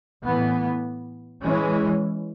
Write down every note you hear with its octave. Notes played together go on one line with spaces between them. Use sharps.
A2 E3 B3
E3 G#3 C#4